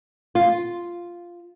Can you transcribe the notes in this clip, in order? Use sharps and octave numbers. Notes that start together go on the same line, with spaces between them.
F4